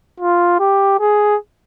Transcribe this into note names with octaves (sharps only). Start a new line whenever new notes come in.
F4
G4
G#4